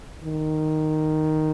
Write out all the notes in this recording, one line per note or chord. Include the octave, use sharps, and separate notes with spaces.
D#3